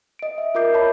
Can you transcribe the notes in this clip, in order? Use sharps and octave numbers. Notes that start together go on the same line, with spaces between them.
D#5 D7
E5
F4 A#4 E5 D6 G6 C7
C#5 A5 B5